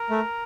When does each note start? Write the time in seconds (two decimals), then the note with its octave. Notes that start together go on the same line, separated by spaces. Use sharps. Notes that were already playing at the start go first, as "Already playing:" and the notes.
Already playing: A#4 A#5
0.10 A3